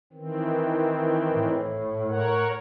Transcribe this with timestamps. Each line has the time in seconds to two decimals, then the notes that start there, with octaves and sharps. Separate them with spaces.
0.13 D#3 E3 C4
1.32 A2
2.08 A#4 C#5 F#5